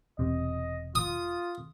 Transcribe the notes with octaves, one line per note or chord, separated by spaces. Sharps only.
E1 C3 D#5
F4 D#6